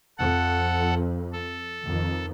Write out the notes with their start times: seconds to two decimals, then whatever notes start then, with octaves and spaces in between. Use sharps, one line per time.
0.18 F2 A4 F#5
1.32 A4
1.87 F2 D#3